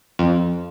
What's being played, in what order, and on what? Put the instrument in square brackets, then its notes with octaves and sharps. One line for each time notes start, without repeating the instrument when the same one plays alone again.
[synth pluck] F2